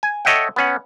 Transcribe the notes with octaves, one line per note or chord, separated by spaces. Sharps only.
G#5
A4 C#5 D#5 E5 F#5 G5
B3 C#4 F#5